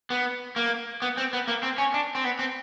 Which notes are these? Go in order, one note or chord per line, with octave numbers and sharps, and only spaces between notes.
B3
A#3
B3
C4
B3
A#3
C4
C#4
D4
C4
B3
C4